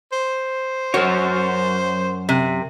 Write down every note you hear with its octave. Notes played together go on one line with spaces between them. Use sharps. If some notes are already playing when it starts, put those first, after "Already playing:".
C5
F#2 F#4 A#4 C#5
C3